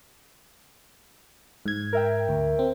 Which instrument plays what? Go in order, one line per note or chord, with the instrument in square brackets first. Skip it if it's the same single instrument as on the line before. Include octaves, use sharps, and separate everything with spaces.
[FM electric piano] G#2 G#6
[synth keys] A#4 E5 G5
[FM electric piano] D2
C4